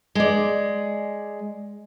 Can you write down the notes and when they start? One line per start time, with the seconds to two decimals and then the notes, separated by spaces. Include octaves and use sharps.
0.15 G#3 D5